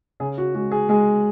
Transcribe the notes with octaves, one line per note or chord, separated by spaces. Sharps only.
C#3 G#4
F#4
G#3 F#4
G#4
G#3 G#4